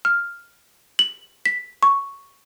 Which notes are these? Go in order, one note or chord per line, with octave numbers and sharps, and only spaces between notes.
F6
F#7
B6
C#6